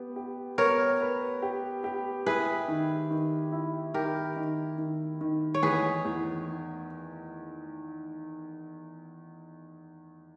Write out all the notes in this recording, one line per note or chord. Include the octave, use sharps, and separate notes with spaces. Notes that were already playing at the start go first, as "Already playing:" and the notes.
Already playing: B3 G4
G4
B3 A#4 C#5
B4
G4
G4
E4 G#4 B4
D#3
D#3
E4
D#3 G4 A#4
D#3
D#3
D#3
C#5
E2 G#4 B4
E2